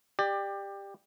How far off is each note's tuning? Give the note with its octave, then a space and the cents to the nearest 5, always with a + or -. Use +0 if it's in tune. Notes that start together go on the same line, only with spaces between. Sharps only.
G4 +15 D5 +25